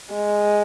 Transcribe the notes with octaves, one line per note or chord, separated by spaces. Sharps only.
G#3